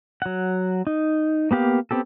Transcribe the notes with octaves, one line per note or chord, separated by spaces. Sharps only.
F#3 F#5
D#4
A#3 B3 G4 F5
B3 C4 G4 A4